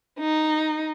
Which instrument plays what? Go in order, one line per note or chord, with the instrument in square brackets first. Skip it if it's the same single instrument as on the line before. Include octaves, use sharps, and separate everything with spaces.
[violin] D#4